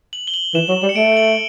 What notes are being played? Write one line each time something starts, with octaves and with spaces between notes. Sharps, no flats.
F#7
G7
F#7
E3 E7
F#3
G3
C#7
A3 D7
F#7